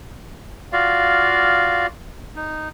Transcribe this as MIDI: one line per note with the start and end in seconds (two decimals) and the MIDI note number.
0.73 1.87 65
0.73 1.87 66
0.73 1.87 74
0.73 1.87 77
2.36 2.68 63